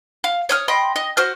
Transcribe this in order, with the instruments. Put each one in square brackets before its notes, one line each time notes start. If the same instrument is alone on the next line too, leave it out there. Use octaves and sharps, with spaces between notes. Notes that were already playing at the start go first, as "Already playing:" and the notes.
[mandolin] F5
C#5 D#6 F6
D#5 G5 B5 C6
D#5
F#4 C5 F6